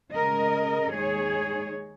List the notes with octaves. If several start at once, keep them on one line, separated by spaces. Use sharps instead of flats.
C#3 G#3 C#4 A#4 D#5
D#2 D#3 G#3 D#4 G#4 C#5